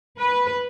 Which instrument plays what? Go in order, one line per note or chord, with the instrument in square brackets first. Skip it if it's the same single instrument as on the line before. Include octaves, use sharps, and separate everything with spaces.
[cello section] B4